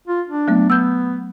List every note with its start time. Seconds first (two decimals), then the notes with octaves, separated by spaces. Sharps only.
0.08 F4
0.28 D4
0.48 F#3 A3 B3
0.70 B3 E6 G6